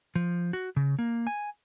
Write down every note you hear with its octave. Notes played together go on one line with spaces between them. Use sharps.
F3
F#4
C#3
A#3
G#5